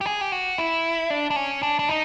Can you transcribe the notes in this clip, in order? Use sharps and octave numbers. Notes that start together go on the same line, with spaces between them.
G4
G#4
G4
F#4
E4
D4
D4
C#4
D4
D4
D#4